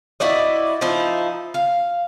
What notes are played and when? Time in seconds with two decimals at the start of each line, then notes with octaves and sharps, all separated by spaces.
0.20 E4 F#4 D5 D#5
0.81 F3 D#4 E4
1.54 F5